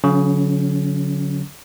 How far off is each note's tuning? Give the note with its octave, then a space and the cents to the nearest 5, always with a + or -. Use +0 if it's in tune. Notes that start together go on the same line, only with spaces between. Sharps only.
D3 -45 F#3 -25 C#4 +0